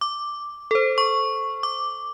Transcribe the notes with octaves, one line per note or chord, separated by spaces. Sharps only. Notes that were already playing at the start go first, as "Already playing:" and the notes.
D6
A4 C5
C#6
D6